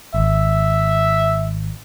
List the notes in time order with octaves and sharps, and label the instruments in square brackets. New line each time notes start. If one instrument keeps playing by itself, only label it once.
[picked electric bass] G#1 [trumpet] E5